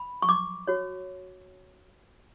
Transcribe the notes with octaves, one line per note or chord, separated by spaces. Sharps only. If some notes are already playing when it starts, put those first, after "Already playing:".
Already playing: B5
C#6
D6
F#4 C#5